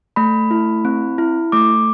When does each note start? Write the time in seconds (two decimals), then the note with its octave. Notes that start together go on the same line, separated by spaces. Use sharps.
0.16 A3 B5
0.51 E4
0.85 C4
1.18 E4
1.52 A3 D6